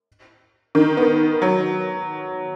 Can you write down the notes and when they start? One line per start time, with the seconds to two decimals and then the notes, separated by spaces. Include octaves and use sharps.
0.75 D#3
0.97 B3
1.42 F#3